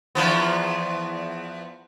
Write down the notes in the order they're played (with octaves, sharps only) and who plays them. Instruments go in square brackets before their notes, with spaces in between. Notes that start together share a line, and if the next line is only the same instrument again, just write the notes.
[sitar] E2 F3 B3